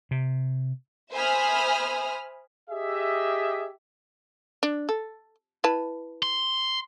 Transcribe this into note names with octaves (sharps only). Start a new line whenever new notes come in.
C3
C5 E5 G#5 B5 D#6 F6
G4 G#4 D#5 E5
D4
A4
E4 B4 A5
C6